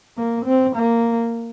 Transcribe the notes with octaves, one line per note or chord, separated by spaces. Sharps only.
A#3
C4
A#3